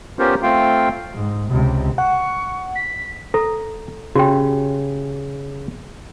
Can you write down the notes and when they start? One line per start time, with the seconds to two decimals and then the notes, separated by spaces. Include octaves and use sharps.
0.19 B3 C#4 F4 G4 A#4 C5
0.43 A3 C4 F4 F5 G5
1.15 G#2
1.50 C#2 C3
1.98 F#5 C#6
2.76 B6
3.34 A4 A#5
4.15 C#3 F#4 G4 G5